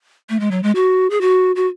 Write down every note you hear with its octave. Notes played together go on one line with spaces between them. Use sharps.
A3
G#3
F#3
G#3
F#4
G#4
F#4
F#4